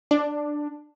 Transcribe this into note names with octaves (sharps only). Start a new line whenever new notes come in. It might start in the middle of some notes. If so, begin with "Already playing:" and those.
D4